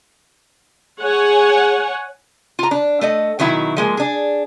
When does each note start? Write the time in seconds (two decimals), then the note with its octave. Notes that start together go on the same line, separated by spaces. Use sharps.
1.00 G#4 C#5 F#5 G#5
2.59 F4 A#5
2.71 D4
3.01 A3 A4 D#5
3.39 B2 D#3 F#3 E4
3.77 F3 G#3 A#3
3.97 D4 G#4